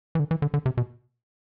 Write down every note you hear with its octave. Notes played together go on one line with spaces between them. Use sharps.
E3
D3
E3
D3
D3
C3
B2